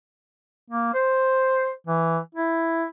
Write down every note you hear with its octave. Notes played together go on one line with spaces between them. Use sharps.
A#3
C5
E3
E4